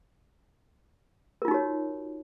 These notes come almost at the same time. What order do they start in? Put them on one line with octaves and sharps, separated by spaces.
A#4 F4 D#4 F#4 C#5